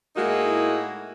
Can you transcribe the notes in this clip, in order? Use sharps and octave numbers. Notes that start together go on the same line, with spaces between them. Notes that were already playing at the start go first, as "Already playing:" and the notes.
A2 G#3 A#3 D#4 E4 F#4